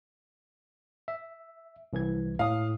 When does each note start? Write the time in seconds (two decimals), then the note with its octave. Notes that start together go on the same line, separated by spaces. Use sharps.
1.08 E5
1.93 C2 E3 G#6
2.39 A2 F5 D#6